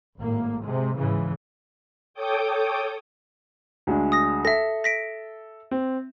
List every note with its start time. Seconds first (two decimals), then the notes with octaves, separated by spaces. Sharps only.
0.20 G#1 A2 A#3
0.64 C3 G#3
0.98 G#2 C#3 E3
2.14 A4 C#5 G5 D6 D#6 G6
3.87 D2 G#3 D4
4.12 D#6 A#6
4.45 A4 E5 A#6
4.84 A#6 B6 D7
5.71 C4